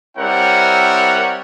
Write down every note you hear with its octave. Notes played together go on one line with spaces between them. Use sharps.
G3 C4 E4 A#4 C#5 F#5